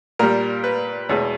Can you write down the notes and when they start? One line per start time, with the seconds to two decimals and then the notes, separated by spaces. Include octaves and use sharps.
0.19 A#2 G3 A#4
0.64 B4
1.09 E2 B2 G#3 C#5